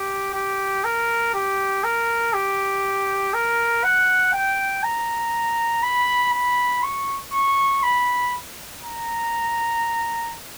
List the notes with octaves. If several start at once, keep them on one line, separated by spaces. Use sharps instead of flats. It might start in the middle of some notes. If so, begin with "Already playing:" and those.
Already playing: G4
G4
A#4
G4
A#4
G4
A#4
F#5
G5
A#5
B5
B5
C#6
C#6
B5
A#5